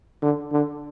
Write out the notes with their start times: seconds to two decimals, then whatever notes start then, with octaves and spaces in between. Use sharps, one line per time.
0.22 D3
0.52 D3